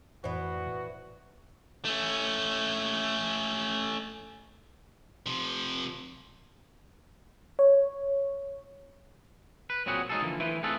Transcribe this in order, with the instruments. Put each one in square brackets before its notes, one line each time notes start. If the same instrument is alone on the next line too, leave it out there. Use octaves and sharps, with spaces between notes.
[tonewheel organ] F2 A2 [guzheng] E3 B3 [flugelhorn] F#4 [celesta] C5 D5
[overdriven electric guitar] A3 C#4
[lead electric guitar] C3 F3
[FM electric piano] C#5
[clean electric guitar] B4
A#2 F#3 C4 F#4 G#4 F#5
F#3 G#3 D#4 F4 G#4 A4
D3 E3 F3 A#3
E3 A3 E4 B4 C5
A3 C4 F4 G#4 A4 B4